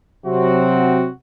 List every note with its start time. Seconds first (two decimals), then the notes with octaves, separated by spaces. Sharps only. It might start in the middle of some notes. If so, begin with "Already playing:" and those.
0.24 C3 F#3 C4 F#4